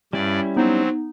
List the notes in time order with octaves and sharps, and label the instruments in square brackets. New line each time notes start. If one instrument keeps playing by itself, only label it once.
[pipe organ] G2 D5 [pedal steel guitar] G3 C#4 E4
[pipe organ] F#3 C4 [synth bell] B3 D#4